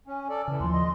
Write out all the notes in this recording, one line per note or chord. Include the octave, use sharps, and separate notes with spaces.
C#4 G#5
A4 D5
C#3 E3
D#2 F3 C6
D#5